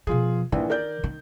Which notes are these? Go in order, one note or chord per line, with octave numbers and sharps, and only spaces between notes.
B2 F3 F4 G#4
A#1 D#3 E3
A#4 D5 G6
D#3